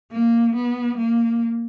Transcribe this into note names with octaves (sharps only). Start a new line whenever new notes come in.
A#3
B3
A#3